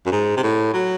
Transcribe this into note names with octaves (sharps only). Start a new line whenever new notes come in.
F#2
G#2
C3
A2
F#3